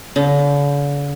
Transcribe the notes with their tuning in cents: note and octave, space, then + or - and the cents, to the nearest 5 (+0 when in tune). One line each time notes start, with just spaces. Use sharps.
D3 -45